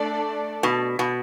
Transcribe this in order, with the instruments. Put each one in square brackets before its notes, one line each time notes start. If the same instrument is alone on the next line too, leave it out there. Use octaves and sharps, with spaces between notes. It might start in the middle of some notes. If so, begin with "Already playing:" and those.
Already playing: [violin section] A3 D4 A4 D5
[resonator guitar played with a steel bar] B2
B2